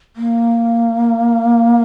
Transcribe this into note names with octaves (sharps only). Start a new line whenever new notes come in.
A#3